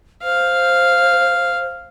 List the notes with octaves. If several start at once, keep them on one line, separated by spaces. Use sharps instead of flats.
C5 F5